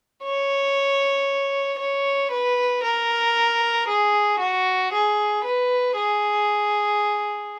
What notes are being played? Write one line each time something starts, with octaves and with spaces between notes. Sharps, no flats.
C#5
C#5
B4
A#4
G#4
F#4
G#4
B4
G#4